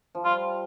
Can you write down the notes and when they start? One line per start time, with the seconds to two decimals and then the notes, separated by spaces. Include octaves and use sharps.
0.15 F3
0.25 G3 F4